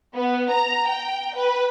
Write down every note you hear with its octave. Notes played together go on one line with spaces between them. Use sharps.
B3
A#5
G5
B4